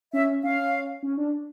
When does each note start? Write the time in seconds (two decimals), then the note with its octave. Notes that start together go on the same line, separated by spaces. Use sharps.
0.13 C#4 E5
0.43 C#4 F5
1.03 C#4
1.17 D4